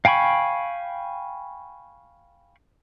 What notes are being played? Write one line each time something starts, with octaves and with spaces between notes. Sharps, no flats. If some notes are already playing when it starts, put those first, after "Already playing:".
F5 G5 G#5 B5 C#6